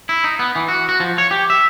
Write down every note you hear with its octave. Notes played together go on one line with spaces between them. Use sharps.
E4
D#4
B3
E3
F#4
F#4
F3
C#5
G4
E5